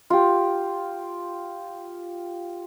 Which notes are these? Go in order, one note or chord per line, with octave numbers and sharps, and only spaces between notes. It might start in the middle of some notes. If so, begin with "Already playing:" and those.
F4 G4